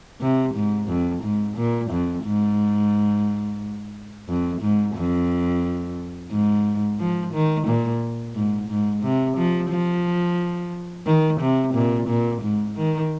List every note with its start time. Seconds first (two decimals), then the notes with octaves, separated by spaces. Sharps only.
0.21 C3
0.54 G#2
0.88 F2
1.23 G#2
1.57 A#2
1.91 F2
2.24 G#2
4.28 F2
4.61 G#2
4.96 F2
6.31 G#2
7.00 F3
7.33 D#3
7.67 A#2
8.35 G#2
8.69 G#2
9.03 C3
9.37 F3
9.70 F3
11.06 D#3
11.40 C3
11.74 A#2
12.08 A#2
12.42 G#2
12.76 D#3